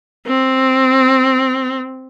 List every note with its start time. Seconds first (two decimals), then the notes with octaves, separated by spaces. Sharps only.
0.27 C4